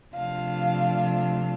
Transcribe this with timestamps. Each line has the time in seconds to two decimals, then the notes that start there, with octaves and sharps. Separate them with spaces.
0.15 C3 F3 A3 D4 F4 F5